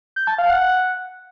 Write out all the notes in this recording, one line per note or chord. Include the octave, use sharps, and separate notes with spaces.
G6
A5
F5
F#5